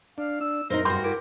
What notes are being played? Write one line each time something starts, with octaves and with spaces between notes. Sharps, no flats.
D4 F5
D4 E6
F#2 D#4 E4 A#4 C5
G2 F#4 C6 G6
E4 A#4 D6